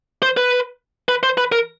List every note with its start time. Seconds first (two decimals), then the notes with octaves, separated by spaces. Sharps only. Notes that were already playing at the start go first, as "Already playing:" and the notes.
0.23 C5
0.37 B4
1.09 B4
1.23 C5
1.38 B4
1.52 A#4